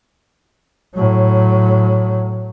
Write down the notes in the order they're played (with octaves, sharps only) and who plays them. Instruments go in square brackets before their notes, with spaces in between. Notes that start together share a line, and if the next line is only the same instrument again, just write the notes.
[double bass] A2 F#3